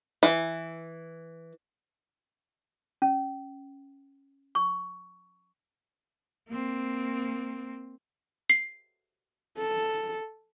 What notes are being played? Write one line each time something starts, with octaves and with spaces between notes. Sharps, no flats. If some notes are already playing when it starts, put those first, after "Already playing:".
E3
C#4
C#6
A#3 C4
C7
A4